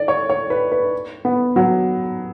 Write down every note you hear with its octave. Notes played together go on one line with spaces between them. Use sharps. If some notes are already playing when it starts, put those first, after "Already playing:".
Already playing: D5
C#5
C#5
B4
B4
B3
F#3